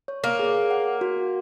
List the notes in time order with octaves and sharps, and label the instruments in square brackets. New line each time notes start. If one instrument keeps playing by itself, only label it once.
[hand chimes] C#5
[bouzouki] A#3
[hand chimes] G#4
F#5
F#4